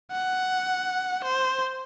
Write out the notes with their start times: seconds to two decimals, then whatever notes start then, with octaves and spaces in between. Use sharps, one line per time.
0.12 F#5
1.24 C5